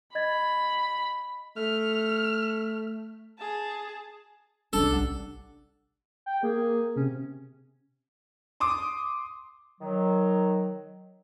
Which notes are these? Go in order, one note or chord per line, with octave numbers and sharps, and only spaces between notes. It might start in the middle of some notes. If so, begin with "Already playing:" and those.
D#5 B5 G#6 A6
A3 F6
G#4 A5
F#1 C2 C#4 D4 A4
A1 G3 F#5
G5
A#3 G#4
C3 C#4
C6 D6 D#6
D#3 F#3